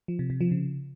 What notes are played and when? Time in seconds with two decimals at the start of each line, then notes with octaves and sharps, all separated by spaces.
0.08 F3
0.19 C3
0.30 C3
0.41 F3
0.51 C#3